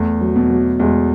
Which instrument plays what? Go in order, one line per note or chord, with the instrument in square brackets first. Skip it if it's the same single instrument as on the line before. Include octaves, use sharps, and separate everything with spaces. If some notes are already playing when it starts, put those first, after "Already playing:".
Already playing: [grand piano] E2 [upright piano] A3
[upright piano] F#3
[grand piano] B2
[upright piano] F#3
[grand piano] E2 [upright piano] G#3